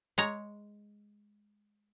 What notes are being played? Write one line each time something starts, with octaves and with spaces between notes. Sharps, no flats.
G#3 C#5 A#5